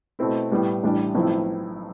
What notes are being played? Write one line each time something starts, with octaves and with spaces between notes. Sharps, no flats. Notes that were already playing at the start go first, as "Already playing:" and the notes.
B2 A3 C4 E4
A2 G3 B3
A1 A2 G3 D4
B1 A2 F3 C4 E4